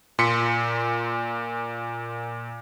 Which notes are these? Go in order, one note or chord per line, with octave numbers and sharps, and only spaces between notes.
A#2 C6 B6 C#7